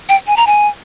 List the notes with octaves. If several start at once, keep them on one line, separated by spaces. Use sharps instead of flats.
G5
G#5
A#5
G#5